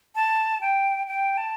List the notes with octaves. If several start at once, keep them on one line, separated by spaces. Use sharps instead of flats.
A5
G5
G5
A5